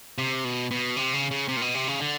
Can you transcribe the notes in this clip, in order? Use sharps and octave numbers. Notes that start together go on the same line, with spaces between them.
C3
B2
B2
C3
C#3
C#3
C3
A#2
B2
C3
C#3
D3